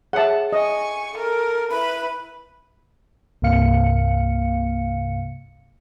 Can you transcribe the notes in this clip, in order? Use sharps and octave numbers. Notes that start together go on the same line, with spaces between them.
G#4 C#5 E5 F#5 A5
D#5 G#5 C#6
A4 A#4
E4 B4 B5
C2 G2 C3 A#3 F5 C#7